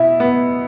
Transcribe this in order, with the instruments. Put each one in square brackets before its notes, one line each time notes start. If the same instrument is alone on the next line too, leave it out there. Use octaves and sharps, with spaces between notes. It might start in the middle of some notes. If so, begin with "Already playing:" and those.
Already playing: [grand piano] B2 E4 [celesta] E5
[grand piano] B3